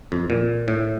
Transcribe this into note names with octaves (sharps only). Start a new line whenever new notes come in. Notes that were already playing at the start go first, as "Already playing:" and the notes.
F2
A#2
A2